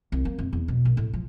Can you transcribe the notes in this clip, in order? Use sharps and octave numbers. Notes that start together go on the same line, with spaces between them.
C2
A#3
F2
E2
B2
A#1
A2
F3